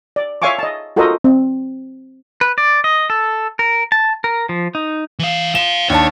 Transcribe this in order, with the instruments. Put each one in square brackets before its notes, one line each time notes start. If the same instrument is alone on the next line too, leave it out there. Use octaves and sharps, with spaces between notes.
[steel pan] D5
C#5 E5 F5 G#5 C#6 D6
D#5 A5
F4 F#4 A4 A#4 C5 D#5
C4
[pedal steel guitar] B4
D5
D#5
A4
A#4
A5
A#4
F3
D#4
[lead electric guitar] E3 F5
[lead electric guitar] C5 F5 [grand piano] E7
[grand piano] D#2 D4 A5 [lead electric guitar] C#5